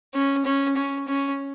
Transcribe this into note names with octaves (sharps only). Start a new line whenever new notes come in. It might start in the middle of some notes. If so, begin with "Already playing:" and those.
C#4
C#4
C#4
C#4